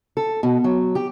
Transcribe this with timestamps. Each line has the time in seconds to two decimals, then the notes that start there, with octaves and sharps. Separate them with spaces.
0.17 A4
0.43 B2
0.64 F#3
0.95 G4